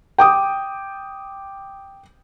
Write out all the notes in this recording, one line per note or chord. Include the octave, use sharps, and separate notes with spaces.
G5 D6 D#6